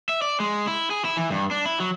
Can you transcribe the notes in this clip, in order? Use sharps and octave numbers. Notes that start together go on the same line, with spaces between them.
E5
D5
G#3
E4
G#4
E4
E3
G2
D4
E4
F#3